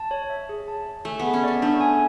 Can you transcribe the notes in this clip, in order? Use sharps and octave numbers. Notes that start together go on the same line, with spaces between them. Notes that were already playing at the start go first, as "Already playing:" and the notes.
Already playing: A5
C#5
E5
G#4
A5
C#5
A3 G#5
B3 G#4
C#4
C#4 D5
A3 D4
G#5